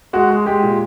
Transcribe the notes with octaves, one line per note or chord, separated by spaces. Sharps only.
G#3 F#4
G#3
G#3 G4
A#2